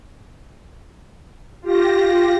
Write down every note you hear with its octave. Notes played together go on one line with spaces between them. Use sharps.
F4 G4 A#6